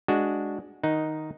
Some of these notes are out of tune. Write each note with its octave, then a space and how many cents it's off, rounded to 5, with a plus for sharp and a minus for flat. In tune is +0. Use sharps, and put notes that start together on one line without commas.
G#3 +0 D4 +0 F#4 +0
D#3 +0 D#4 +0 F#5 +10